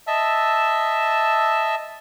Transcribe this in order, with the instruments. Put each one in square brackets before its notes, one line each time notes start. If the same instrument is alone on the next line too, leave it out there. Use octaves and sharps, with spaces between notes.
[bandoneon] D#5 E5 A5 E6